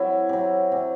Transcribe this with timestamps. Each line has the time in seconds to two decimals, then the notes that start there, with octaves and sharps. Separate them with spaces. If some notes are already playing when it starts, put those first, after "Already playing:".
Already playing: C3 F#3 E4
0.29 C3 F#3
0.72 C3 F#3